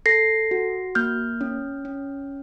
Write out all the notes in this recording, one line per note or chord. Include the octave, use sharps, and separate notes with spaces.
A4 A#6 C7
F#4
A#3 F6 G6
C#4
C#4